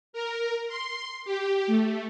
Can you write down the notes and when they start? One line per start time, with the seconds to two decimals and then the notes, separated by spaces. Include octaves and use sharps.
0.13 A#4
0.68 C6
1.25 G4
1.67 A3